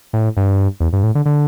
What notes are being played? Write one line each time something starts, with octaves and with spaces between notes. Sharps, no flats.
A2
G2
E2
G2
A2
D3
D3